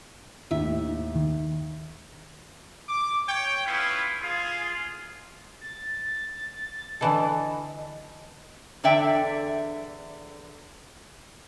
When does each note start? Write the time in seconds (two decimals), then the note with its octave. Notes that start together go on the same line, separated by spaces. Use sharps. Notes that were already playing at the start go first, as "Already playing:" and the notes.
0.51 D#2 A2 E5
1.15 D#3
2.89 D6
3.28 C#5 G5
3.66 B3 C#4 E4 F4
4.22 F4 G#4
5.61 A6
7.01 D3 E3 A4 D#5
8.83 E2 D3 D5 E5 G5